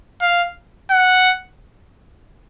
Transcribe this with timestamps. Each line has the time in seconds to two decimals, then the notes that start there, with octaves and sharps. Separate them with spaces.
0.21 F5
0.90 F#5